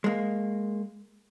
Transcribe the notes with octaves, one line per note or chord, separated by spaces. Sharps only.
G#3 A#3